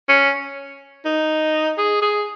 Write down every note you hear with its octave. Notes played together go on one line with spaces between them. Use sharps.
C#4
D#4
G#4
G#4